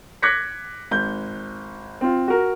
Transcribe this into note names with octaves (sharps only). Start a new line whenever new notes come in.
D6 F#6 G#6 A#6 B6 C#7
G#1 G6
C4 F4
F#4 A#4